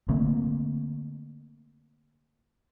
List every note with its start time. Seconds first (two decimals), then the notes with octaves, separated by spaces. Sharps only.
0.08 D3 A3 A#3 C4